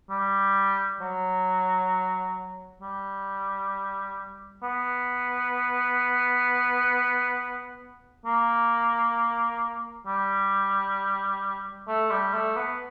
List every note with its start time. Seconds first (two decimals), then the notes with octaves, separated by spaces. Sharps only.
0.10 G3
1.00 F#3
2.81 G3
4.63 B3
8.25 A#3
10.07 G3
11.88 A3
12.11 G3
12.33 A3
12.57 B3